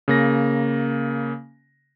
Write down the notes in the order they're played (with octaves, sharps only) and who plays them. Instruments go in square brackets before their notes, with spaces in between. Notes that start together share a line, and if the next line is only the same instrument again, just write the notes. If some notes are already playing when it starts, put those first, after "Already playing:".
[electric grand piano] C#3 A#3 A#6